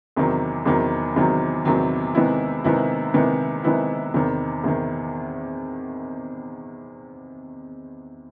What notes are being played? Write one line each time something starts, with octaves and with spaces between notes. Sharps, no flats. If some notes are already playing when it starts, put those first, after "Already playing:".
E2 C3 D#3 F#3
E2 C3 D#3 F#3
E2 C3 D#3 F#3
E2 C3 D#3 F#3
C3 D#3 G#3 B3 E4
C3 D#3 G#3 B3 E4
C3 D#3 G#3 B3 E4
C3 D#3 G#3 B3 E4
E2 C3 D#3
E2 C3 D#3